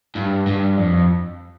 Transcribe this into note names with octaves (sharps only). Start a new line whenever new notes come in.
G2
G2
F2